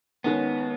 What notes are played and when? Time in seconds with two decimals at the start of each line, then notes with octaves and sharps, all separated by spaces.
0.24 D#2 D#3 G#3 B3 C#4